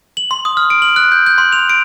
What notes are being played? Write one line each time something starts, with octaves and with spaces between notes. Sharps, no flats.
F#7
C6
D#6
F6
D7
F#7
F#6
G6
G6
C6
F7
D7